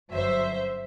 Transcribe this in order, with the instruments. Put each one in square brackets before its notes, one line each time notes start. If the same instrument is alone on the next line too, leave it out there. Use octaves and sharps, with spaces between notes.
[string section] G1 F#2 F#3 C5 E5